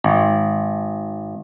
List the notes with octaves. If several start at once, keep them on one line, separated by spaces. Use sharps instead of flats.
G#1